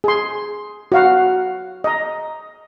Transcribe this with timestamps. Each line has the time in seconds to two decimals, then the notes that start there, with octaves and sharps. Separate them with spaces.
0.04 G#4 C6
0.92 F#4 F5 F#5
1.84 D#5 A#5